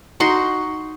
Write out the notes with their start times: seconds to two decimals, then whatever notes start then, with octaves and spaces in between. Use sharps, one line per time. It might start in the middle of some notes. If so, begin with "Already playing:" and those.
0.20 D#4 F#4 C6